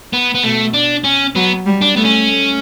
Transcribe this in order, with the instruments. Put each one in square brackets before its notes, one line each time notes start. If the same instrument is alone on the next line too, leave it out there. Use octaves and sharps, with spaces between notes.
[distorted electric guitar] B3
B3
[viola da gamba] B2 [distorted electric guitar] A3
[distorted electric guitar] D4
C#4
[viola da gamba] F#3 [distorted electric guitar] B3
[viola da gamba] G3
[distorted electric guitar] D4
[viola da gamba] A3 [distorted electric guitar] B3
[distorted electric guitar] C#4
[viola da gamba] A3